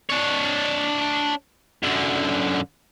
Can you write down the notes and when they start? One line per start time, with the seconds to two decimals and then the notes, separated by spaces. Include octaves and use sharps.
0.09 D4 C#5
1.83 F#2 D3